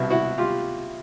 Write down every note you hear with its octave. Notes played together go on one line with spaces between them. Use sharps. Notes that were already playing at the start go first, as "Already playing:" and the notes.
Already playing: C2 B2 E4 F#4
E4 F#4
F4 G4